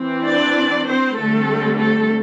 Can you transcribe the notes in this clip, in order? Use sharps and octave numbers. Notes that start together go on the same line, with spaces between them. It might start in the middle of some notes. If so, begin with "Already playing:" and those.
Already playing: E3 C4
D4 D5
C4 C5
D3 G3 A3 C4 A4
A3 A4